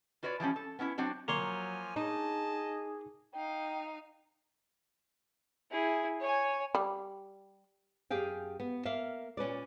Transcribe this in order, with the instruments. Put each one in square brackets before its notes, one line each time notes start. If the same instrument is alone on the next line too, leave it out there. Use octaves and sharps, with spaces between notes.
[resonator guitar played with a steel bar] F4 F#4 B4 C#5 D5
E3 F3 G3 C#4
A4
B3 C#4 D#4 E4
F#3 C4 D4 F#4
[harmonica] F3 G#5 [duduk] F#3 [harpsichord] A#3 C#5 C6
[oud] D#4 [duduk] G#4 [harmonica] D#5 A5
[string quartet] D#4 F5 [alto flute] G5
[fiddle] E4 G#4
C#5 G#5
[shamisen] G3
[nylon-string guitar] F#2 G4 G#4 F5 G5
B3
A#3 E5 F5
A#2 C#4 B4 D5